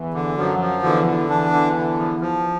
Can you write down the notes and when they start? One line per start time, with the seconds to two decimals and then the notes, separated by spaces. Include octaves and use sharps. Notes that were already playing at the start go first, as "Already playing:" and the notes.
Already playing: E2 E3
0.14 D3
0.37 F#2 F3 F#3
0.60 F3
0.83 E2 D3 E3
1.06 D3
1.29 E2 E3 D4
1.53 D3
1.75 D3
1.98 F3
2.21 F3